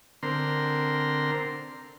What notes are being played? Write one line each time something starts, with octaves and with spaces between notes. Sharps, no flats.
D3 C4 A#4 C6